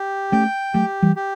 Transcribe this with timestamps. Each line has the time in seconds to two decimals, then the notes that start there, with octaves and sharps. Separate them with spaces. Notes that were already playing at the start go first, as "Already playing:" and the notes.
Already playing: G4
0.32 A3 C#4 G5
0.74 F#3 A3 G4
1.02 E3 G3
1.16 G4